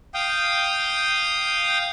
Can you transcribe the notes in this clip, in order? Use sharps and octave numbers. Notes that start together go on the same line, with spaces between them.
F5 G5 D#6 G6